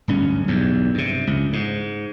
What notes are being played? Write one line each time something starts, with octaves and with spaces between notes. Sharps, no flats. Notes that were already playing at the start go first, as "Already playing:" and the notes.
D1 G2 C#4
B1 E2 G2
G2 C3
C#2
G#2